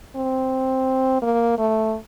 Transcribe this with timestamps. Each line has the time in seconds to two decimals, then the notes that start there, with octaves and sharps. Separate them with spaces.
0.16 C4
1.22 A#3
1.58 A3